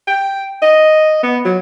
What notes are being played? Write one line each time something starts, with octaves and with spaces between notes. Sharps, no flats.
G5
D#5
B3
F#3